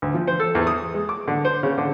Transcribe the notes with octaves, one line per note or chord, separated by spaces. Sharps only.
D2
F3
C5
A4
E2
D#6
G#3
D6
D3
C5
C#3
D3